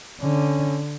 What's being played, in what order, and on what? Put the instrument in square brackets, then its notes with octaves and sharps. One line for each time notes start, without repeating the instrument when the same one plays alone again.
[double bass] D3 [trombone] C#4